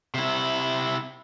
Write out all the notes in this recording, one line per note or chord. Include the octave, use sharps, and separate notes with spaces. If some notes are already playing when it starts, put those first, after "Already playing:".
C3 E4